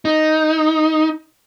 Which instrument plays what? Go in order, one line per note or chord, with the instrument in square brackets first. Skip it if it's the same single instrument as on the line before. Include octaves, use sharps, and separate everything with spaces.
[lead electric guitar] D#4